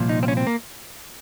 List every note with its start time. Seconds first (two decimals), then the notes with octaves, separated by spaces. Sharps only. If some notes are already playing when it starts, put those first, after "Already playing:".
Already playing: C2 A#2 F3
0.09 D#4
0.23 C4
0.28 C#4
0.37 C4
0.47 A#3